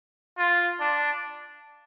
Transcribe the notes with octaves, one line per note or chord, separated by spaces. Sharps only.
F4
D4